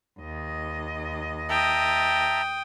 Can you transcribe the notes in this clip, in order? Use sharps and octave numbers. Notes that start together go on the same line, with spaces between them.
D#2 D#5
E5 G5 A5 A#5 D#6